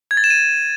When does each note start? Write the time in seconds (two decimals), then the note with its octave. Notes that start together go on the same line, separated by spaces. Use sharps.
0.11 G#6
0.17 A6
0.24 E7
0.30 D#7